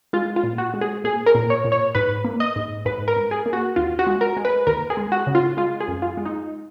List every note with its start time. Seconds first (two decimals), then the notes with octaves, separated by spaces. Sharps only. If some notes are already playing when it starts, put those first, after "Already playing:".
0.13 G#3 F4
0.36 F4
0.43 A#2
0.58 F#4
0.74 G#3
0.81 G#4
1.04 A#2 G#4
1.26 A#4
1.35 A#2
1.50 C#5
1.64 A#2
1.72 C#5
1.95 G#2 B4
2.24 A#3
2.40 D#5
2.56 G#2
2.85 G#2 B4
3.08 A#4
3.16 G#2
3.31 G#4
3.46 A#3
3.53 F#4
3.76 D#2 F4
3.99 F#4
4.07 G#3
4.21 A#4
4.37 G#3
4.45 B4
4.67 D#2 A#4
4.90 G#4
4.97 G#3
5.12 F#4
5.27 C#3
5.35 F4
5.57 G#3 F4
5.81 G#4
5.88 F#2
6.02 F4
6.17 G#3
6.25 D#4